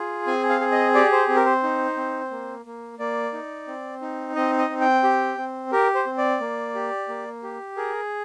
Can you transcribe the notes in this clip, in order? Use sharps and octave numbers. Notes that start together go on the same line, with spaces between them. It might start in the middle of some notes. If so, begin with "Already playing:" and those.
Already playing: F4 G#4
C4 G#5
F5
G#4
D#5
G4 D5
C5
C4
A#4
C5
D#4
C4
A#3
A#3
A#3 D5
D#4
C4
D#4
C4 D#5
D#5
C4
G5
G4
C4
G4 A#4
C5
C4
D5
A#3
G4
A#3
G4
G#4 A#4